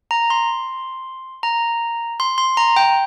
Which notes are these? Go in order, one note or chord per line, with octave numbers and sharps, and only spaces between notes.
A#5
C6
A#5
C6
C6
A#5
G5